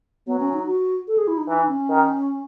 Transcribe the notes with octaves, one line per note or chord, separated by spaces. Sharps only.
F#3 B3
C#4
D#4
F#4
A4
G#4
E4
D#4
E3 D#4
C#4
D#3